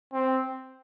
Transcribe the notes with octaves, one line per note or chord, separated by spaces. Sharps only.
C4